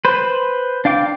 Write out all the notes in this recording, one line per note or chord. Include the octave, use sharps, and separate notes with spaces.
B4 C5
D4 F5 G5 D6